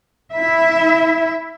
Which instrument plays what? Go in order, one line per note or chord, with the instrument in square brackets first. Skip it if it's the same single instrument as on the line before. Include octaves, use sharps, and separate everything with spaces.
[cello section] E4 E5